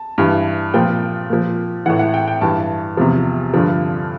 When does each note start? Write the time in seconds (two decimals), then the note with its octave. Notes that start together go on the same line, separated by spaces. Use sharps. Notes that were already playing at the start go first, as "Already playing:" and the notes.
Already playing: A5
0.18 G2 E3
0.74 A#2 F3 G5
1.30 A#2 F3
1.86 A2 E3 F#5
1.99 F#5
2.14 G5
2.28 G5
2.41 G2 E3 A5
2.97 E2 C3 F3
3.54 G2 D3 F3